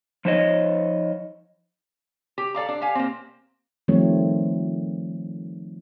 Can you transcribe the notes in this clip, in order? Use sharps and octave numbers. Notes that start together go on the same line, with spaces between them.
F3 D#4 C5 C#5 D#5
G4
A4 D5 F5 A#5
D4
G4 F5 G#5
A#3 C4
D#3 F3 G3 A3 C4 C#5